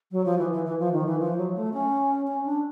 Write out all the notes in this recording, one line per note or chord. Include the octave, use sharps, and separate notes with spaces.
F#3
F3
E3
E3
E3
F3
D#3
E3
F3
F#3
A3
C#4
C#4
D4